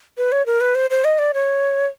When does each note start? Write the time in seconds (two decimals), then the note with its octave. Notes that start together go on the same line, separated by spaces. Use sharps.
0.17 B4
0.32 C#5
0.46 A#4
0.61 B4
0.75 C5
0.90 C5
1.04 D#5
1.19 D5
1.34 C#5